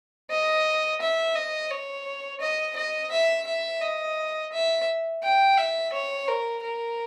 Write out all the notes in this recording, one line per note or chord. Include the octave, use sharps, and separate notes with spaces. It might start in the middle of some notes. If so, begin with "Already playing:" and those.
D#5
E5
D#5
C#5
D#5
D#5
E5
E5
D#5
E5
G5
E5
C#5
A#4
A#4